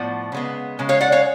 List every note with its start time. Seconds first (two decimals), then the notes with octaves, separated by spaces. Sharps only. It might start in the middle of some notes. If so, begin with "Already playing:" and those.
Already playing: A2 F3 B3 D5 F#5
0.32 C#3 G#3 B3
0.79 C#3 G#3
0.89 C#5 F5
1.01 D5 F#5
1.12 C#5 F5